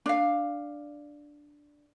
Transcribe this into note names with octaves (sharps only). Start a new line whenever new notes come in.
D4 F5